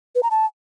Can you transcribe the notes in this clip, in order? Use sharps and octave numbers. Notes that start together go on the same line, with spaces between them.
B4
A#5
A5